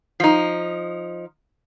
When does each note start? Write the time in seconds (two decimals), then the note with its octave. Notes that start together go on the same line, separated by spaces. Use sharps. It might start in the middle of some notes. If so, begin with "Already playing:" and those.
0.20 F3 D#4